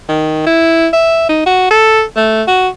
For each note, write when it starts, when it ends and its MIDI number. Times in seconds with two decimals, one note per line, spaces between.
0.08 0.44 51
0.46 0.87 64
0.93 1.26 76
1.29 1.42 63
1.46 1.66 66
1.70 2.03 69
2.16 2.43 57
2.47 2.68 66